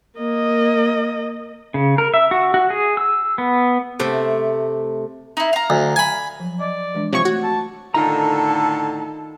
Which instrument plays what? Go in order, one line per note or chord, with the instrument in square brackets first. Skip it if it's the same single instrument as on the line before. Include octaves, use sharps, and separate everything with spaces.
[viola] A#3 D#5
[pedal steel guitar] C#3
A#4
E5
F#4
F#4
G#4
E6
B3
[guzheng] C3 A3
[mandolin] D#4 E4
F5 A#5
[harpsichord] D2
G#5 B5
[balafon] F3 F#3
[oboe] D5 [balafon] D#5
[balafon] E3 G#3 D4
[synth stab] C3 F3 C#6 [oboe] C#5
[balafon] A3 [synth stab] F#4
[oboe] A5
[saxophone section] A2 D3 [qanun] D#3 D#4 F4 [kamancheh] A4 A5 [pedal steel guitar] A#5